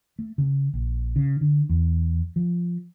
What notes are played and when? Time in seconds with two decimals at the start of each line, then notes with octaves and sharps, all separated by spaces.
0.19 A3
0.38 C#3
0.74 A#1
1.16 C#3
1.41 D3
1.69 E2
2.36 F3